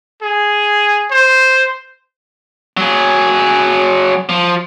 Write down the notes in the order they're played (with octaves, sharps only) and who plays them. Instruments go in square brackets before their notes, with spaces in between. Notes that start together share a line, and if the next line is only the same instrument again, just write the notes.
[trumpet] G#4
C5
[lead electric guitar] F#3 G#4
F3